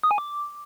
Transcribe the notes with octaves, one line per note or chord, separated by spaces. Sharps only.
D#6
G#5
D6